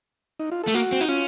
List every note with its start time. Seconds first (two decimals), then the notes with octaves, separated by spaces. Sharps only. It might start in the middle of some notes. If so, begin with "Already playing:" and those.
0.39 D#4
0.52 F4
0.64 A3 A4
0.74 A#3 F#4
0.92 C4
1.01 D#4
1.09 C#4 F4